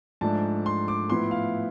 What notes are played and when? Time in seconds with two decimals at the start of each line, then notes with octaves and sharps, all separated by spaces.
0.21 G#2 F3 A3 D4 A5
0.66 C6
0.88 D6
1.09 A2 F3 B3 E4 C6
1.31 F5